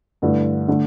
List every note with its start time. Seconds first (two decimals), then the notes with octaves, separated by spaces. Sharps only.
0.22 G2 D3 A3 E4
0.68 D3 A3